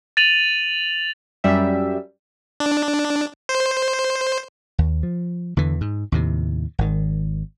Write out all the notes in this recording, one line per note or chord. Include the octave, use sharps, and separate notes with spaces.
A6 D#7 F7 F#7
F#2 G3 E5
D4
C5
D#2
F3
E2 D3 E3
G#2
D#2 A2 C3
G#1 D#3